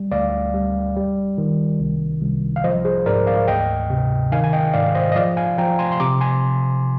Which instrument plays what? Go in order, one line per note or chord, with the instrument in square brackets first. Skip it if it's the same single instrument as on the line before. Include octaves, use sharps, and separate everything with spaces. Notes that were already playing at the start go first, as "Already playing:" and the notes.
Already playing: [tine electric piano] G3
D2 D5 F5
G3
G3
D#3
C2
C2
F5
F3 C5 D#5
G#4 C5
G#2 A#4 D5
D5 F5
D2 D#5 G5
C3
D#3 F5 G#5
G#5
D#5 G5
G#2 D5 F5
C5 D#5
D#5
F3 D5 F5
F5 G#5
F3 G5 A#5
G#5 C6
C6
C3 A#5 D6
G#5 C6